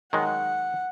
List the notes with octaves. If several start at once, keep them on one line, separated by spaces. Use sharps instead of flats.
D#3 F#3 G#3 F#5